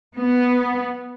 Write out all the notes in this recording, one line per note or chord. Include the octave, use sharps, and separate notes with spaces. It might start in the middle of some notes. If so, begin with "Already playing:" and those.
B3